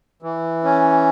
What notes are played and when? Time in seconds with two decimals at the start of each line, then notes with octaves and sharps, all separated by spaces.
0.22 E3
0.64 C#4